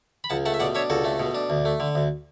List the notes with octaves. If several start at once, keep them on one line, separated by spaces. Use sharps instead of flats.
B5
C#2 F#5 A5
A3 F#5 A5
E5
B2 D5 F#5
D4 C#5 E5
C#2 F#4 A4
A3
B2
D4
D2
A3
D3
D2